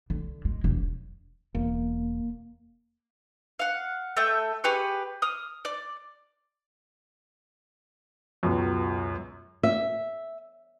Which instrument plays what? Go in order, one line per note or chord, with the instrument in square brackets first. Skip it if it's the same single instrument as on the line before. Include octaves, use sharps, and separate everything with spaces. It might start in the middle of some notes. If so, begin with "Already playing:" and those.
[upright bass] D3
G#3
E1
[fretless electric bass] E1 [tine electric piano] A#3
[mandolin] F5 F#5
A3 E5 G5
G4 G#4 B4 C#6
D#6 F6
D5
[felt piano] C#2 F#2 B2
[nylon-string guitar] E5